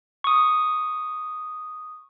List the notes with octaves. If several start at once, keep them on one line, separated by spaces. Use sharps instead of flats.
C#6 D#6